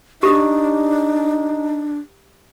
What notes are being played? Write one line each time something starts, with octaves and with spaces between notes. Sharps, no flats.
D4 D#4 G4 D#6